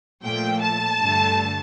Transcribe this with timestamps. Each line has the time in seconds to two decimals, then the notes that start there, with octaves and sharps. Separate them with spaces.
0.24 A#2 F3 A3 G5
0.62 A5
0.99 G2 D3 A3